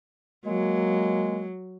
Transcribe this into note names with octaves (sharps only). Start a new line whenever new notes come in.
F#3 G#3 A#3